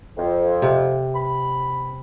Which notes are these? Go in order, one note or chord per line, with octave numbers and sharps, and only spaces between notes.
F2
C3
B5